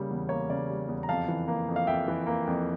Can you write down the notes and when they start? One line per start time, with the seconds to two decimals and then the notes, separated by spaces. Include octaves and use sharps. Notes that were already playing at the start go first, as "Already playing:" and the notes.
Already playing: C#3 G3 A#3
0.10 E2
0.29 A#3 C#5
0.50 C#3 D5
0.70 G3
0.88 E2
1.03 A#5
1.09 F2 F5 A5
1.28 E3
1.48 A#3
1.68 F2
1.76 F5
1.87 F2 E5 G5
2.08 E3
2.26 A#3
2.47 F2